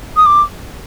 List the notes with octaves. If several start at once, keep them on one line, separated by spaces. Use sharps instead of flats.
D#6
D6